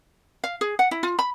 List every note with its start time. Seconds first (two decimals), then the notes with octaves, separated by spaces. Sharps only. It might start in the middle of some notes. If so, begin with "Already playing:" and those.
0.44 F5
0.61 G#4
0.79 F#5
0.91 E4
1.03 F4
1.19 B5